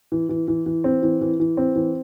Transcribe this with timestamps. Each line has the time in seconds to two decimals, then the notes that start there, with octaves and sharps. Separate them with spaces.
0.12 E3
0.29 E3
0.48 E3
0.66 E3
0.84 C4
1.03 E3
1.21 E3
1.40 E3
1.57 C4
1.76 E3